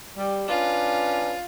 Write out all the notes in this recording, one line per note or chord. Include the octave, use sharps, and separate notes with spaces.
G3
C#4 D4 F4 B4